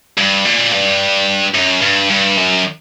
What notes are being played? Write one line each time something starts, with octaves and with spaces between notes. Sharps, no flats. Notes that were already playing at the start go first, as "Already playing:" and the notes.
G2
A#2
G2
F#2
G2
G2
F#2